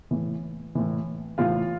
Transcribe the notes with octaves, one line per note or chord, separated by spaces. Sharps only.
A2 E3
A2 E3
A2 E3 F4 F5